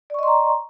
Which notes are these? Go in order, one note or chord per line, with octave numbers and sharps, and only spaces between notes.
D5 D#5 A#5 C6 C#6